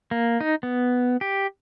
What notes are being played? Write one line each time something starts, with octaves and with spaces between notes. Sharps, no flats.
A#3
D#4
B3
G4